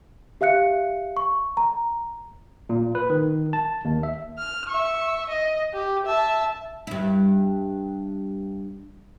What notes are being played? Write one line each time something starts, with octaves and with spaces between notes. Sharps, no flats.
G4 E5 F5 F#6 C#7
C#6
A#5
A#2
B4
D#3
A5
D#2
E5
F6
E5 C#6
D#5
G4
E5 A5
G2 E4